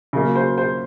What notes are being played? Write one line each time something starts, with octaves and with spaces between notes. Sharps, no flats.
C#3 F#3 A#3
C5
C5